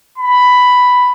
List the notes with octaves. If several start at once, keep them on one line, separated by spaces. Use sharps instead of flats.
B5